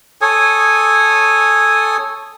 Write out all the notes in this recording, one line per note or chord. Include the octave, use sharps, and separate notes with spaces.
A4 C#5 G#5 D#6